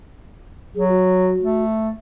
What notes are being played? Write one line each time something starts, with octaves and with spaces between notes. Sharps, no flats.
F#3 G#4
F#4
A3